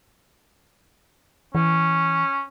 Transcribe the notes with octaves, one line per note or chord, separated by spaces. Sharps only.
E3 C#4